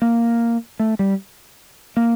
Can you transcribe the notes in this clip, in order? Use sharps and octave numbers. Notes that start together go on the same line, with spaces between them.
A#3
A3
G3
A#3